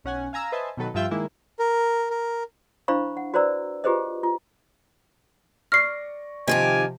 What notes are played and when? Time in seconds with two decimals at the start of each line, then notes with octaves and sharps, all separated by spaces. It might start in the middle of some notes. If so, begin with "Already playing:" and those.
0.04 B1 C#4 F#5 G#5
0.33 F5 G#5 A#5 E6
0.52 B4 C5 D#5 E5 G#5 A5
0.77 B2 D#3 F#3 A4 B4
0.94 G2 F3 F4 E5 G5 G6
1.11 D#3 G#3 A#3 E4
1.59 A#4
2.10 A#4
2.88 D4 E4 C5 F5 B5 C#6
3.17 F#5
3.34 F#4 B4 C5 D5 A#5 E6
3.84 F4 G4 G#4 B4 C5 D#5
4.23 F4
5.72 D5 C#6 F6 A#6 C7
6.48 C3 D#3 F3 F4 G4 C5 G#5